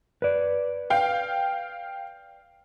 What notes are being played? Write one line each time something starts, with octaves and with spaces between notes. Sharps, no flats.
B4 D5
F5 G5